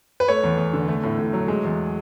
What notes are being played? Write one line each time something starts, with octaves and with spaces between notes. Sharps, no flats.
B4
A3 C#5
E2
E2
D3
A3
A2
A2
F#3
G#3
E2